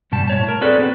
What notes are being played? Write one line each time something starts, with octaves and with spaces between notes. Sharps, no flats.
G2 B2 G3 A5
A2 C#5 A5
A#4
C4 F#4 G#4 A4 B4 D5
B3 C4 B4